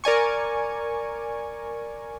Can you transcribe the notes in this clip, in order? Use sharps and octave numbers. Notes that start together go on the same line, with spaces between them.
A#4 D5 G#5 C#6